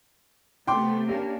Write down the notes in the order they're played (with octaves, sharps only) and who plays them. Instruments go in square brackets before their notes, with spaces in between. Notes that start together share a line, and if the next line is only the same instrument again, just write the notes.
[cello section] C3 A3 B3 [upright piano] G5 C6 D6
[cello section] A#3 C#4 D4 [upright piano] G4